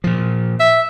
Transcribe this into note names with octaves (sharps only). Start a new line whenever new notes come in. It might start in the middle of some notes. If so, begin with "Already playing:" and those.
A#2 F3
E5